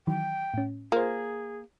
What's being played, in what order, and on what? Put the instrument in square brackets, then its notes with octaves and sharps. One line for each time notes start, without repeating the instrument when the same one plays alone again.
[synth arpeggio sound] D#3 E3 F#3 [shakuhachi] G5
[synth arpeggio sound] A2 C#4
[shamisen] A#3 [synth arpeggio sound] F4 C5 [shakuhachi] G#4